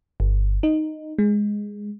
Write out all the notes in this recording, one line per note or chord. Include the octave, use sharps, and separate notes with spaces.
G1
D#4
G#3